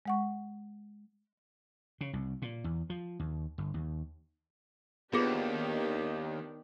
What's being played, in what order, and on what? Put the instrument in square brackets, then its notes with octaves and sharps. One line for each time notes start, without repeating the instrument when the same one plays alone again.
[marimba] G#3 F#5 C#6
[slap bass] C#3
C2
A#2
E2
F3
D#2
G1
D#2
[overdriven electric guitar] D#2 [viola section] D#3 D4 G4 [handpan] B3 [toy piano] F4 G#4